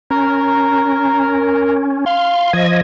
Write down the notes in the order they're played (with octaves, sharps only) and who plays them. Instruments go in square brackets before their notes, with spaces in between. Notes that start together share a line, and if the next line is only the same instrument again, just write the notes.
[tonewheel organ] C#4 [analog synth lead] A#4
[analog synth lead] F5 [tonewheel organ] C6
[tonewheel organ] F3 D#5 [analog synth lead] G#6